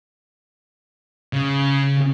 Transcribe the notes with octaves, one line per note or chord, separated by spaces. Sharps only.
C#3